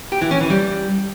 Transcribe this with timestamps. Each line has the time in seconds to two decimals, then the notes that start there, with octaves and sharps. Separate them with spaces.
0.12 G4
0.21 E3
0.31 C#4
0.41 E3
0.50 G3